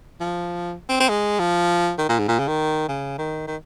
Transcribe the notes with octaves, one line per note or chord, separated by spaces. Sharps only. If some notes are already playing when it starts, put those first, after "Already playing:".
F3
C4
C4
G#3
F3
D#3
A#2
G#2
A#2
C#3
D#3
C#3
D#3
D#3